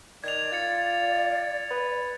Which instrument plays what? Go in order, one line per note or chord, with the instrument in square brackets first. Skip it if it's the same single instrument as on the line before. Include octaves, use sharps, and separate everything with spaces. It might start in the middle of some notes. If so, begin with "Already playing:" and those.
[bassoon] D#3 [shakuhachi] D5 [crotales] G#6 F7
[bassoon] F4 [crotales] G#6 A6 C#7
[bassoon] B4